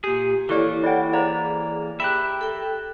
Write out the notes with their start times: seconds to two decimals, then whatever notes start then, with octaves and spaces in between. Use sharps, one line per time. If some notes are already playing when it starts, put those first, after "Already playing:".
0.04 A#2 G4 G#4
0.49 E3 A#3 E4 G4 A4 C#5 D5
0.84 E4 D5 E5 F#5 G5
1.13 G#4 C5 D5 F5 A#5
2.00 G4 A#4 E5 G5 B5 F#6
2.41 A4 G5